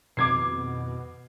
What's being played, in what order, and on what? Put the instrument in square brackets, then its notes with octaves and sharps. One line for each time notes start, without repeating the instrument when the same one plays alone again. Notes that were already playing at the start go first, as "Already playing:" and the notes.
[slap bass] F2 D#3 C4 [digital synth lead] B2 [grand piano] D6 G#6 C7